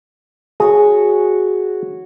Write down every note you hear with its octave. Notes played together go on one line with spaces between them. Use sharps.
F#4 G#4 C#5 F#5